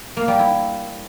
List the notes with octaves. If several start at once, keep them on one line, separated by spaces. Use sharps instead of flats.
A#3
G3
E4